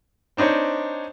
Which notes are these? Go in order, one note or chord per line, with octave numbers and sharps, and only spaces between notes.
C4 D4 D#4 C5 C#5